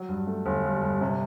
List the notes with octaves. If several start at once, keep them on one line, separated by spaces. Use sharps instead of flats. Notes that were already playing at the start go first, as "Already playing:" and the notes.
Already playing: F#3
G2
A3
G1
G2
G2
C3